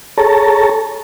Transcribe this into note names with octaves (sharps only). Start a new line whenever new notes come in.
G#4 A4 C#5 A5 A#5